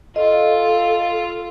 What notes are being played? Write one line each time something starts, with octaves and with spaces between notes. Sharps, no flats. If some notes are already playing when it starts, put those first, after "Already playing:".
F4 A4 D#5